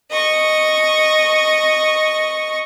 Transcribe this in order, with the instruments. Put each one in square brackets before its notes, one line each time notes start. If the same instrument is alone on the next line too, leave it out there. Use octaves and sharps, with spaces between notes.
[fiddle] D#5 C#6